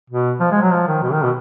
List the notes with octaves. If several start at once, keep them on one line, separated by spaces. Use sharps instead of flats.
B2
F3
G#3
F#3
F3
D#3
B2
D#3
B2